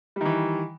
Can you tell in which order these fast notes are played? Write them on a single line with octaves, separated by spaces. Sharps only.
G3 D#3 E3